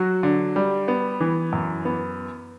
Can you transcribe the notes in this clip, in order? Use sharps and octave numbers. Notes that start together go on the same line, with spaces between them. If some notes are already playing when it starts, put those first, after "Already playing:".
Already playing: F#3 F#4
D3
G3
B3
E3
F#2
B3